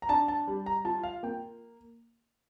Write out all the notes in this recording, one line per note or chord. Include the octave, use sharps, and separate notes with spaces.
A#5
D4 A5
A5
G3
A#5
F4 A5
F5
A#3 G5